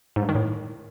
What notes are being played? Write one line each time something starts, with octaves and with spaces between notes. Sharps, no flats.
G#2
G2
D#3
A2